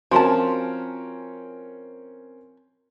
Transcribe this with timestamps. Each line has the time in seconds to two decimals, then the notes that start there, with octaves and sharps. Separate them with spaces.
0.11 F3 C4 C#4 F#4 A#4 G#5 A5 C6